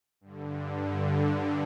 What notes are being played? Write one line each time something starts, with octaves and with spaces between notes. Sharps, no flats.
G2 D3